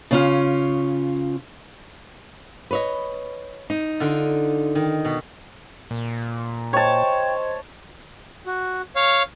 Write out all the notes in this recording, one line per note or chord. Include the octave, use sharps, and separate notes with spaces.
C#3 C#4 F4
B4 C#5 D#5
D#4
D3 F4
D#3
B2
A#2
C5 C#5 D#5 G5 A5 C6
F#4
C#5 F5